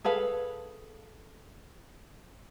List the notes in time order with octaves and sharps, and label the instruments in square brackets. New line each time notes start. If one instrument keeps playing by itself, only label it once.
[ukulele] G#4 A4 B4 F5